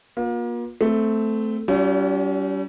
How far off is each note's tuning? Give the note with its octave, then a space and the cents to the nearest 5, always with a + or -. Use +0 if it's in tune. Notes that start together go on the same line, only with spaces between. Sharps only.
A#3 +35 F4 +40
A3 +0 C4 -15
G3 -30 C#4 +35 F4 +20